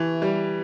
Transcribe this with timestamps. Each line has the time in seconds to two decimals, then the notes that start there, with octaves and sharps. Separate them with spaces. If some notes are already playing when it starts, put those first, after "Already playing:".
Already playing: E3 G4 B4 E5 A5 C#6
0.22 G3